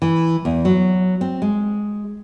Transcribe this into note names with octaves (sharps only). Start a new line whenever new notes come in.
E3
E2
F#3
C4
G#3